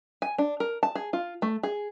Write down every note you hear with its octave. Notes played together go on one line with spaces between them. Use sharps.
G#5
D4
A#4
A5
G#4
F4
A3
G#4